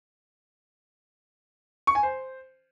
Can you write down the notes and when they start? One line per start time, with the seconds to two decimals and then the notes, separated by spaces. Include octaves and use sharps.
1.87 C#6
1.95 G#5
2.03 C5